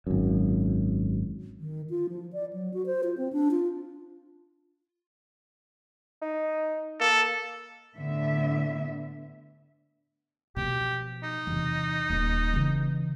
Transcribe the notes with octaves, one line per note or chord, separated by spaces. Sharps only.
G#1 F#2
D#3
F4
F3
D5
F#3
F#4
C5
F4
C4
D4
F4
D#4
A#3 A4
A2 D3 B3 D4 E5
B2 F3 G4
D#4
E2 C3
D#1
C#3 E3